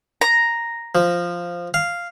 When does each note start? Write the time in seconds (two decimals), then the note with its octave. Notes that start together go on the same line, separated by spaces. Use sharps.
0.21 A#5
0.95 F3
1.74 F5